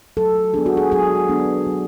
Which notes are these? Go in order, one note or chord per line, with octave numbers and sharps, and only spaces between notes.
F#3 A4
B3 D4 G#4
F#4
G#4
F#3 G#4
B3 D4
F#3